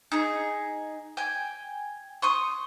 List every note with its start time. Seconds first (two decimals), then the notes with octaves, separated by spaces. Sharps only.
0.12 D#4 G#4
1.17 G5 G#5
2.22 C6 C#6 D#6